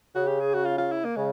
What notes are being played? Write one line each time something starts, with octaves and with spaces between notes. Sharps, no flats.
C#3 F#4
G4
G#4
F#4
F4
F4
E4
A#3
C#3 G#3